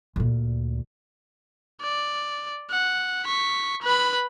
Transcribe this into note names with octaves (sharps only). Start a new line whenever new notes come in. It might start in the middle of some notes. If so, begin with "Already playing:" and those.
D2 A#2
D5
F#5
C#6 B6
B4 B5